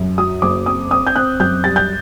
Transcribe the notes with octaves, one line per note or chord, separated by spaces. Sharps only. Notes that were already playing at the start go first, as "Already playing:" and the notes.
Already playing: F#2
F#3 D#6
F#1 D6
C4 D#6
C4 D#6
G6
C4 F#6
F#2 G6
G3 A6
G6